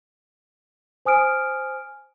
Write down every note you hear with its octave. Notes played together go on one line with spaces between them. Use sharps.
C5 G#5 D#6 F6 D7